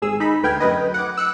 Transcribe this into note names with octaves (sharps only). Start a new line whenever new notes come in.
G#1 G#4 E6
D#4 B5
D2 B4 G5 F6 G#6
F#2 B4 D#5
F#5 D6
E6 F#6 C#7 D7